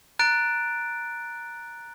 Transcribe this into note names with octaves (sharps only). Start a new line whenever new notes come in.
A#5 F#6 A6 D7